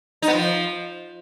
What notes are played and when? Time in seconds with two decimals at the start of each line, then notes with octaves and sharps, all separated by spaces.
0.22 D#4
0.28 B3
0.33 F3